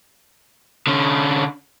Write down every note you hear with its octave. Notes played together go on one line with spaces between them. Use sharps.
D3 C#4